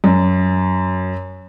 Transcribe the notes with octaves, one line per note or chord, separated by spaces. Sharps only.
F#2